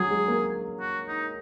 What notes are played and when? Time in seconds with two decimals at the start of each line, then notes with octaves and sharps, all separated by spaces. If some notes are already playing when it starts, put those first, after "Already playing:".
Already playing: F#3 G#4
0.10 G#3
0.28 A#3
0.81 F#4
1.08 D#4